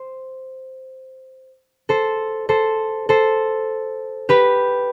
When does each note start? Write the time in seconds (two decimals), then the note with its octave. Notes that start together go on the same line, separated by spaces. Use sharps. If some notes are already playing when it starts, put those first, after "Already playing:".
Already playing: C5
1.89 A4 C5
2.49 A4 C5
3.09 A4 C5
4.29 G4 B4